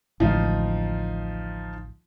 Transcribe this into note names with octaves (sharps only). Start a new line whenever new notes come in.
A1 D2 F3 G#3 D#4 F4